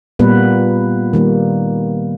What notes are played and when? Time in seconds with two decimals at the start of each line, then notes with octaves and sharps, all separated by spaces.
0.19 A#2 G3 A#3 B3 B4
1.13 D#3 G3 A#3